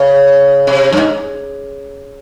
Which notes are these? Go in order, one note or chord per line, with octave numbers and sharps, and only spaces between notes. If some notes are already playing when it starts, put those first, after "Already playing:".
Already playing: C#3
C3
G2
G#2